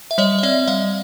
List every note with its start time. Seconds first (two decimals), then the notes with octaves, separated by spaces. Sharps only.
0.11 E5
0.18 G3 C#5 D#5
0.38 D#5
0.43 C4 D5 E5
0.67 G3 D#5 F5